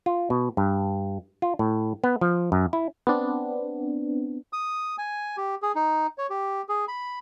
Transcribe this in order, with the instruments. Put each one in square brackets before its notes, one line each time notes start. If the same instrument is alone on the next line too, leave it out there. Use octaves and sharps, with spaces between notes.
[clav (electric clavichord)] F4
B2
G2
F4
A2
B3
F3
F#2
E4
[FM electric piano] B3 C4 D4
[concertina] D#6
G#5
G4
G#4
D#4
C#5
G4
G#4
B5